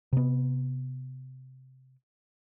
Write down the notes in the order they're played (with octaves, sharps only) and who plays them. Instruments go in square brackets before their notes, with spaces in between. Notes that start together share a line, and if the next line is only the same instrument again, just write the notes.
[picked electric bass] C3 B3